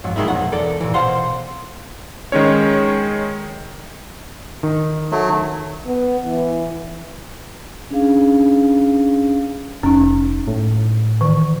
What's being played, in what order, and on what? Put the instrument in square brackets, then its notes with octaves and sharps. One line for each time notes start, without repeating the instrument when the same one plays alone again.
[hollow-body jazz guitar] F2 G#2 F#3
A#2 D#3 F3 G#3 D#4 E4
B1 F2 F#5
E2 A4 A#4 D5
A#2 E3
B2 C5 F5 F#5 C6
[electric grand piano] D#3 G#3 C#4 C#5
[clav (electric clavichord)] D#3
[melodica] F#3 A3
[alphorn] B3
E3
[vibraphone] C#4 D4 G#4 F5
[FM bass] F1 [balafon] C#4 D#4
[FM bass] A2
[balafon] D#3 E3